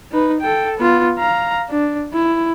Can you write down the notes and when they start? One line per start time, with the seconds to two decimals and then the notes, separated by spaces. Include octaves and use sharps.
0.12 D#4 B4
0.40 A4 G5
0.78 B3 F4
1.19 F5 A#5
1.70 D4
2.13 E4